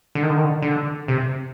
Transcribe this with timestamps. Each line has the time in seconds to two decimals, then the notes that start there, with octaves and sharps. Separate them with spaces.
0.15 D3
0.23 D#3
0.30 D3
0.37 D#3
0.45 D3
0.62 D3
1.08 C3